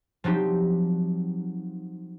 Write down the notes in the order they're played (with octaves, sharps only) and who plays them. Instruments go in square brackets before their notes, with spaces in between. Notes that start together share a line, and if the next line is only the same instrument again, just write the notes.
[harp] F3 F#3 C4 D#4 G4